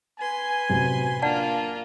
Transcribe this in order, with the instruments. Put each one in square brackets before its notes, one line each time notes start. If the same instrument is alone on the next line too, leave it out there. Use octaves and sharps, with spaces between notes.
[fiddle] B4 C6 [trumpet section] G#5
[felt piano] A1 C3 F#3
[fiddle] A#3 F4 [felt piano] D4 [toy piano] D5 F#5 A5